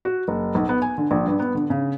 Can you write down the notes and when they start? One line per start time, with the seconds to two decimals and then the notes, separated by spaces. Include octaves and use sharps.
0.05 F#4
0.28 F#1
0.55 B1
0.69 B3
0.82 G#5
0.98 D3
1.11 A#1
1.26 G2
1.40 B3
1.55 D3
1.70 C#3